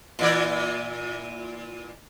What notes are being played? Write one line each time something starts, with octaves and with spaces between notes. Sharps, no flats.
A#2 E3 D5